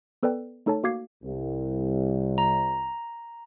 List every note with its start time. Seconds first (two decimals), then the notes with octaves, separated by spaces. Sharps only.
0.23 B3 A4 B4 D5 G5
0.66 A3 D#4 A4 C#5 A5
0.83 A#3 F#4 F5 D6 G#6 C7
1.23 C2
2.38 A#5